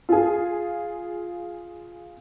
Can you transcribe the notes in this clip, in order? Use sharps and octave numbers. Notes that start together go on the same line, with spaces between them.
F4 G#4